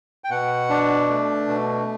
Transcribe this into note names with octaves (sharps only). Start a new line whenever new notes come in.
G5
B2 F#5
D4
A3
B2